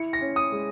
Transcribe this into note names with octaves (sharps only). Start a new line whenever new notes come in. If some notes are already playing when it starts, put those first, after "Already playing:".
Already playing: E4 C#7
A#6
C#4
D#6
G#3